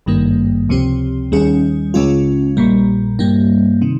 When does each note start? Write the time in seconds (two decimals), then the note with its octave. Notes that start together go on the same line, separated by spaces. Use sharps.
0.06 G#1 G2 D#3 G3 A#3
0.69 C#2 C3 F3 C4 G4
1.32 D#2 D#3 G3 C#4 G#4
1.94 C#2 C#3 G#3 C#4 F4
2.57 A#1 A#2 G3
3.19 G2 G3 A#3
3.82 C3 D#3